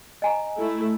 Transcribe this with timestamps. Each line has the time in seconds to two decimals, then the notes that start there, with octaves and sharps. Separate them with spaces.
0.22 D#5 G#5 A#5
0.57 A3 E4